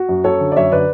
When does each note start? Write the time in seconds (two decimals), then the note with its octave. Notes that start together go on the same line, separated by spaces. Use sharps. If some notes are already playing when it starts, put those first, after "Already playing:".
Already playing: F#4
0.09 F#2
0.24 F#2 A4 C#5
0.40 D3
0.52 D5
0.56 F#2 C#5 E5
0.72 D3 B4 D5